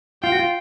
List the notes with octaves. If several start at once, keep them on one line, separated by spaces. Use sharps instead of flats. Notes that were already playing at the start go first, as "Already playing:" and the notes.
F4 G5
F#4
F4